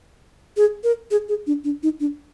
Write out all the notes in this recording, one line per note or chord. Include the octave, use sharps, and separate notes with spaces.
G#4
A#4
G#4
G#4
D4
D4
D#4
D4